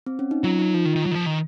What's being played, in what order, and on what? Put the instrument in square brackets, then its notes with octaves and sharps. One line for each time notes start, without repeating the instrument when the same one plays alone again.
[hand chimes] C4
C#4
D#4
[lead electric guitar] F#3 [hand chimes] F4
[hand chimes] D#4
[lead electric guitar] F3 [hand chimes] F4
[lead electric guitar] D#3
D#3
F#3
D#3
F3
D#3